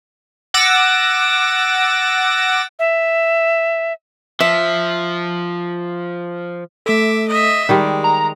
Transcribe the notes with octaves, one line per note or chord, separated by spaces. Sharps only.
F#5 D6 E6 A6 A#6
E5
F3 E5
A3 A4 E5 D6
D#5 E5
D#3 G3 G#3 G4 D5
A#5